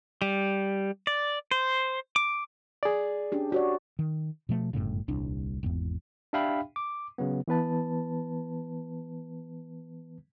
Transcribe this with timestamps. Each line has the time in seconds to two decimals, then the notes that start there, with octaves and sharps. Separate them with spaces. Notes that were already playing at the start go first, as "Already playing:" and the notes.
0.22 G3
1.07 D5
1.51 C5
2.16 D6
2.83 G#4 D5
3.32 C#4 D4 G4
3.52 F#4 G4 C#5 D5
3.99 D#3
4.49 B2 F3 A3
4.73 G1 F#2 A2 C#3
5.08 D#1 C2 D4
5.63 D#1 G#1 E2
6.33 D4 G4 E5 F5 G5 B5
6.76 D6
7.18 C#3 F#3 B3
7.48 E3 B3 B4 A5